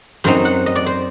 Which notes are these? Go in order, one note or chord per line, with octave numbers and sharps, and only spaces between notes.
F#2 F#3 C4 D#4 C5
F#5
D#5
D5
C5